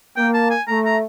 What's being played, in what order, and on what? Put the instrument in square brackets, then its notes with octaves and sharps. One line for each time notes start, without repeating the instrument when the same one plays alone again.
[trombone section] A#3 [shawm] G5
[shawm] A5
G#5
[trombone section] A3 [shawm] A#5
[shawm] A#5